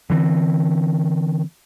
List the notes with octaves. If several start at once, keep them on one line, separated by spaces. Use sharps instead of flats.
D3 E3 G#3 C4